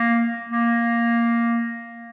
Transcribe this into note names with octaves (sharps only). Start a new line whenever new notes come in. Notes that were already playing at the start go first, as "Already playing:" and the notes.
Already playing: A#3
A#3